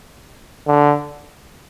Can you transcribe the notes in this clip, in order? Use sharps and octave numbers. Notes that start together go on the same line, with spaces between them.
D3